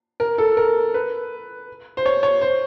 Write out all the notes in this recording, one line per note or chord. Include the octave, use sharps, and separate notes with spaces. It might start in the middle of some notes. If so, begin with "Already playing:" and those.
A#4
A4
A#4
B4
C5
C#5
C#5
C5